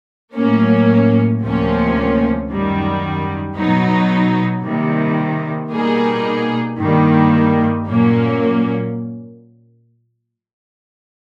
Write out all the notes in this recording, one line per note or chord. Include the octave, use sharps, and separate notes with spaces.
A2 F#3 A#3 C#4
D2 C3 F3 A#3 C#4
F#2 D#3 G3
B2 F#3 B3 D#4
C3 D#3 G3 A#3
B2 G3 A#3 D#4 G#4
G2 D#3 G3 A#3
A#2 F#3 A#3 C#4